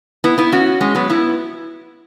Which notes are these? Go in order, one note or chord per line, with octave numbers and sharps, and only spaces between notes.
B3 E4
B3 E4
C#4 F#4
G#3 C#4
F#3 B3
B3 E4